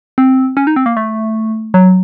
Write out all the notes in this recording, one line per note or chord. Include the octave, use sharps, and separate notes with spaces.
C4
C#4
D#4
C4
A#3
A3
F#3